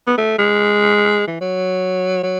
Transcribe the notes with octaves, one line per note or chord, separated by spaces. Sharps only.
B3
A3
G#3
E3
F#3
F#3